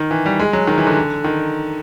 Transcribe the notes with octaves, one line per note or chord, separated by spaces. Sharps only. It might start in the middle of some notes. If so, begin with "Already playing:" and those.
Already playing: D#3
E3
G3
G#3
F#3
D#3
E3
D3
D#3